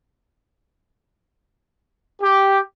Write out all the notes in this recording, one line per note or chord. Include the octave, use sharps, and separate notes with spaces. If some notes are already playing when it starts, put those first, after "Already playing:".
G4